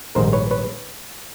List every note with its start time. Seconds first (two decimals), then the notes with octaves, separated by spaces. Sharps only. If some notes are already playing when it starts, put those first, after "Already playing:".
0.15 A#1 G#2 D#3 G3 A#4 C5
0.33 B4 C#5
0.51 B4 C#5